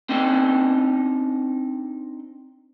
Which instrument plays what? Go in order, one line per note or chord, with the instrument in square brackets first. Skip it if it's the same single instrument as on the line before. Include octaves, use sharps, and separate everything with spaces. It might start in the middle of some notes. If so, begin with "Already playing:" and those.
[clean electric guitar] C4 D4 D#4 G5